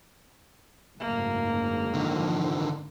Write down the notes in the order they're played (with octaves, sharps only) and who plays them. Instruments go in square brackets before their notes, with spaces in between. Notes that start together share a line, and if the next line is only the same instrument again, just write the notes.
[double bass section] F#1 D2 G#2 [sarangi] A#3
[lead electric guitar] D3 D#3 [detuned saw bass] F3